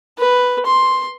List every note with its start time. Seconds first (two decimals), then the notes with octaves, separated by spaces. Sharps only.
0.19 B4
0.66 C6